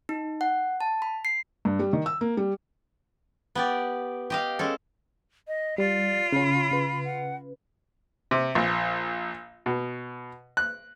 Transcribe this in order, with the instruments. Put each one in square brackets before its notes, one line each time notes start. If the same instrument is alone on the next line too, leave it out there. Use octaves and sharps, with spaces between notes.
[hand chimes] D#4
F#5
A5
B5
C7
[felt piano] G2
G3
D#3
E6
A#3
G3
[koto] B3 G4 D5
G4 D#5 F5
G#3 C#4 A4
[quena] D#5
[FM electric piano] G3 [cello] F4 [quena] D5
[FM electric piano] C#3 C#4 [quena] B5
[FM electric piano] C#3 B4
[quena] F#5
[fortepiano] C3
A#1
B2
F#6